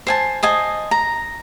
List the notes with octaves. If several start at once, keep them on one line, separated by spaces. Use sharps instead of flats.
C5 G#5 A5
C5 D#5 G#5 A5
A#5